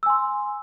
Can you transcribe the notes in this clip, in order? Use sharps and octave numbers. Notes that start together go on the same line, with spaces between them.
G#5 C6 E6